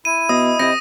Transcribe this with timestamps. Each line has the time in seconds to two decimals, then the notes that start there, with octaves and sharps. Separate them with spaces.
0.05 E4 D#7
0.29 B2 D#5 D#6
0.59 C3 G4 D#5 A#6